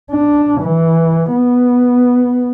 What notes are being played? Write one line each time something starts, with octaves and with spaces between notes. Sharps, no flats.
D4
E3
B3